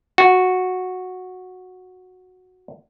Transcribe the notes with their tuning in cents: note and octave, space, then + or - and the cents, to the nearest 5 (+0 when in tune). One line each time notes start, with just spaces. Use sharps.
F#4 -10